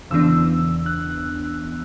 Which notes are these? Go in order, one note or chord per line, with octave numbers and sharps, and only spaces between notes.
E2 C#3 E3 B3 D4 E6
F#6